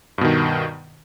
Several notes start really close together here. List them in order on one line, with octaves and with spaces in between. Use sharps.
G2 B2 D#3